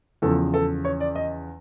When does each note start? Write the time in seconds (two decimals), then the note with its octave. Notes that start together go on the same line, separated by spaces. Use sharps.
0.22 E2 C#3 F3 A4
0.54 A4
0.85 C#5
1.00 D5
1.15 D#5